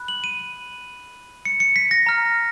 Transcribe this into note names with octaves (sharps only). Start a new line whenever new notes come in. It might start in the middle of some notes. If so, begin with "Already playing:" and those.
Already playing: B5 F#6
F#7
D#7
C#7
C#7
B6
A#6
A#5 F6